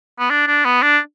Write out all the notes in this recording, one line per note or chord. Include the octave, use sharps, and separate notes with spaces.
B3
D4
D4
B3
D4